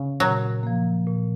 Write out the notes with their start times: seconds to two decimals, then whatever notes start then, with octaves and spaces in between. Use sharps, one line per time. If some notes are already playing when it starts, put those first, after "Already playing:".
Already playing: C#3
0.20 A#2 F#3
0.63 F3 A#3
1.07 A#2